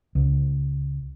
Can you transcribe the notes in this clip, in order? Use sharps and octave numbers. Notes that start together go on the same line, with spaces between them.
C#2